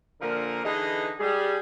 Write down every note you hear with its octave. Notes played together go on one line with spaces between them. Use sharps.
A#2 D3 F3 A#3 A#4
D3 E3 D#4 G#4 B4 D#5
G3 G#4